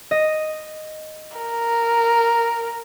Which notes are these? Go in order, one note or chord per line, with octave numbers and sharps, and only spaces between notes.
D#5
A#4